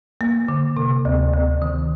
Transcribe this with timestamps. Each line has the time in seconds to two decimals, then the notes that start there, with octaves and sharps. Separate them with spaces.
0.21 A#3
0.48 D3
0.77 C3
1.05 D2
1.33 D2
1.62 D#3